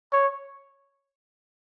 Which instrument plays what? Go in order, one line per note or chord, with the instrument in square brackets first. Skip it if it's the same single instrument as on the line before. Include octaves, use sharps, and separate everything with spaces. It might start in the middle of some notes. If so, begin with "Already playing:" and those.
[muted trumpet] C#5